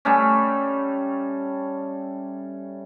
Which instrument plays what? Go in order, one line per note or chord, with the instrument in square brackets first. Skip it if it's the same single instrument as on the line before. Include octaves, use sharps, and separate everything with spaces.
[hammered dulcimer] G3 A3 C#4